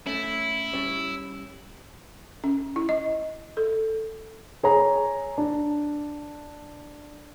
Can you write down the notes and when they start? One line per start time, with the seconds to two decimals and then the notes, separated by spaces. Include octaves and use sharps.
0.07 A3 C#4 E4
0.73 G3 C#4 C#5
2.44 C#4
2.76 E4
2.89 D#5
3.57 A4
4.63 G#4 C#5 A#5
5.38 D4